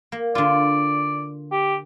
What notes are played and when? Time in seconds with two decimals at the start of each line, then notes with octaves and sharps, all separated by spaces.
0.12 A#3
0.35 D3 F4 D5
1.52 G4